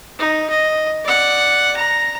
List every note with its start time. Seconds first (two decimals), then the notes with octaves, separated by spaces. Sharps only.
0.19 D#4
0.50 D#5
1.04 D5 F#5
1.76 A#5